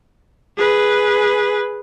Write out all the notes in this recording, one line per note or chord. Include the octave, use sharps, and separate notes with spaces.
G#4 B4